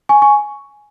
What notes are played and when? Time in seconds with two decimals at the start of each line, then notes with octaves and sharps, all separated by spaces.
0.09 G#5 C#6
0.22 G#5 C#6